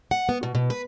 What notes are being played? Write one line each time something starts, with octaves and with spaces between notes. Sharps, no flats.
F#5
B3
B2
B2
B4